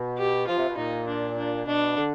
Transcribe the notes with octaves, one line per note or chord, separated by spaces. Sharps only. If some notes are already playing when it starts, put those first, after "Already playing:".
Already playing: B2
G4
F3 F4
C3
B2
A#2 D#4
D4
D4
B2 D4
D3